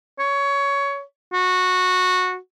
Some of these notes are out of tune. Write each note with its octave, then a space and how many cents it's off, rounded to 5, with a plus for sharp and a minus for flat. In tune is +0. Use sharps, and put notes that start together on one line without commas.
C#5 +15
F#4 -15